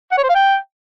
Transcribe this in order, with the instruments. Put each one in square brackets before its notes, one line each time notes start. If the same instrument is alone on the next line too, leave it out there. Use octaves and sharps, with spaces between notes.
[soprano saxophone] F#5
C#5
C5
F5
G5